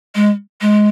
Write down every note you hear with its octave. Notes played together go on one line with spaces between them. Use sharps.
G#3
G#3